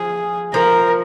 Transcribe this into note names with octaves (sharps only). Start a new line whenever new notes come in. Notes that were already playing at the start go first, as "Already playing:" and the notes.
Already playing: F3 G#4
F3 A#4